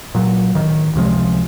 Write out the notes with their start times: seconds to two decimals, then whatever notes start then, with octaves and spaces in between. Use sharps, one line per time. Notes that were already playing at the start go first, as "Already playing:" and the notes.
0.15 A#2 F#3
0.55 D1 D#3
0.95 C#2 C3 F3 G#3